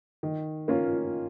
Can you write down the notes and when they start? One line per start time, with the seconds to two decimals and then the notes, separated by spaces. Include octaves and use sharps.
0.23 D#3
0.68 A#3 C#4 F4